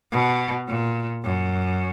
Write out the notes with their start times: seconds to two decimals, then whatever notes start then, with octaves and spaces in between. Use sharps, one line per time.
0.12 B2
0.68 A#2
1.24 F#2